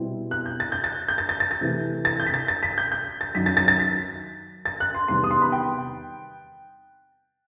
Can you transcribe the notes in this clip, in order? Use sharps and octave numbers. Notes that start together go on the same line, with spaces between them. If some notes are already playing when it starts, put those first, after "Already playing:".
Already playing: B2 G3 C4 E4
F#6
G6
A6
G6
A6
G6
A6
A6
A6
A6
C3 E3 A3
A6
G6
B6
A6
A6
B6
G6
G6
A6
F#2 D#3 F#3 B6
A6
A6
A6
B6
A6
F#6
C6
E2 C3 D#3 G3 B3 C6
D#6
C6
B5
G5